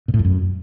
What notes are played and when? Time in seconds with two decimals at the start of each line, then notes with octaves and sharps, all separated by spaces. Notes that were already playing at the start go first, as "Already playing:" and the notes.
0.08 A#2
0.14 A2
0.19 F2
0.25 F#2